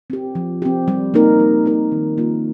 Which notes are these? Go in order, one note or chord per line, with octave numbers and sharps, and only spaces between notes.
C4 G4
F3
C4 G4
G3
A#3 D#4 A#4
G3
A#3 D#4 A#4
D#3
A#3 F4